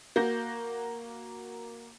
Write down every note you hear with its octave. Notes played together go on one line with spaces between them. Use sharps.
A#3 F#4 G6 A#6